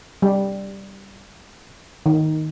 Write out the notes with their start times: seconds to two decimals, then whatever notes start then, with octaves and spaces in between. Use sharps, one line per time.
0.22 G3
2.06 D#3